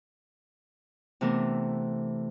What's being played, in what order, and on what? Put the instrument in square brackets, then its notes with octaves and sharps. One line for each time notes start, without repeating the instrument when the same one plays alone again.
[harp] C3 E3 A3 B3 D4 A#4